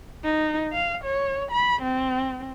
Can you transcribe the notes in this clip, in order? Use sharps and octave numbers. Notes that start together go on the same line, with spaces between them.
D#4
F5
C#5
B5
C4